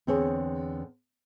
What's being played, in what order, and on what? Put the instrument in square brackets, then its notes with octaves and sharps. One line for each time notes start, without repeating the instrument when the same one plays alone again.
[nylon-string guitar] E2 D3 C4 G#4 C#5